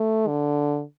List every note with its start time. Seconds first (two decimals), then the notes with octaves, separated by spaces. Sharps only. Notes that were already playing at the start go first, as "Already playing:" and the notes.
Already playing: A3
0.27 D3